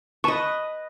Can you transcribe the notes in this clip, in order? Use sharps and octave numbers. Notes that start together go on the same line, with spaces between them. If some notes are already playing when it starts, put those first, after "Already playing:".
B4 D#5 A5 C#6